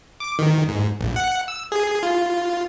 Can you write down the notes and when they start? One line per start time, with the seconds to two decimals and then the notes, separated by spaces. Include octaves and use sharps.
0.20 D6
0.39 D#3
0.68 G#2
1.00 A#1
1.16 F#5
1.48 E6
1.72 G#4
2.03 F4